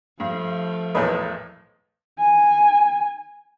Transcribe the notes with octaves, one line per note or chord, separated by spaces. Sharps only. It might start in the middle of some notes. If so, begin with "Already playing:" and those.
G2 F3 A3
B1 E2 A2 A#4 B4 D#5
G#5